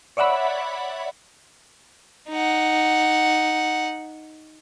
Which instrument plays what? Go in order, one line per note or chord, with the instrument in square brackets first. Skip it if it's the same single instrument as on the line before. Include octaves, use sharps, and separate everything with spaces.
[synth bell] C#5 D5 E5 F#5 B5
[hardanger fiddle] D#4 F#5